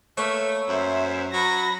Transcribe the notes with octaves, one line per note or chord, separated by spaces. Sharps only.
A3 A#3 B4 C#5
F#2 C5 E5
F#3 B5 A#6